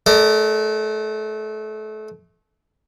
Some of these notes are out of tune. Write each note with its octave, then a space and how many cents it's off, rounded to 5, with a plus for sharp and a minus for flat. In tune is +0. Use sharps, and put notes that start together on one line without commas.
A3 -30 A#4 -20 D5 +15